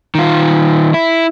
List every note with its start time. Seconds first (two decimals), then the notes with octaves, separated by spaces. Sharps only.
0.15 D#3 F4
0.94 E4